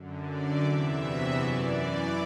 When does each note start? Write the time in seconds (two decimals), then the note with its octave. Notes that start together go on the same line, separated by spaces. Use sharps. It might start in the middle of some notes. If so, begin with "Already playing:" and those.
Already playing: F#2 D3
0.28 D5
0.64 E2 C3 E3 E5
1.00 F#4
1.36 F#2 E3 D5